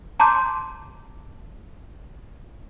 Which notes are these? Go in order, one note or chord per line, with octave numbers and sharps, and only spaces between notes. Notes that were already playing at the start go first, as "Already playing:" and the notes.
A5 A#5 C6 D6 G6